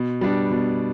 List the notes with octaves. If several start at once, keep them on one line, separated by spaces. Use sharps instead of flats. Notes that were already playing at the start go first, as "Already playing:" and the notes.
Already playing: B2
G3 B3 D4
B2